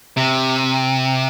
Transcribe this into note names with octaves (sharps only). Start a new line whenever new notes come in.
C3